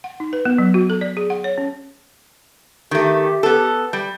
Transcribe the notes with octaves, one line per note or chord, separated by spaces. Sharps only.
F#5
D#4
B4
B3
F#3
F#4
A4
D5
G#4
F#5
C#5
C#4
D#3 A3 G4
B3 A4
G3